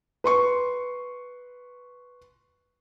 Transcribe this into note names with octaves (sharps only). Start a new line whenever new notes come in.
B4 C6 C#6